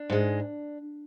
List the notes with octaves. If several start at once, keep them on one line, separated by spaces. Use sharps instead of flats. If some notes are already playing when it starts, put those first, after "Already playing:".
Already playing: D4
G#2 G#3